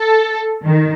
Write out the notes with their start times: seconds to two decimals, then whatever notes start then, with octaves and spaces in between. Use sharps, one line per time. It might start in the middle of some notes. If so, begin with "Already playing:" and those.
Already playing: A4
0.64 D#3